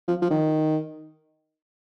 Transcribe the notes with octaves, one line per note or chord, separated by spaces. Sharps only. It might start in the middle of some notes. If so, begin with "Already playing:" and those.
F3
F3
D#3